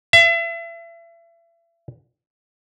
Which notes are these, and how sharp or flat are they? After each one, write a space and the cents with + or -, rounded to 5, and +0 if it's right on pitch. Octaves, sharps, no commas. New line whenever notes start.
E5 +35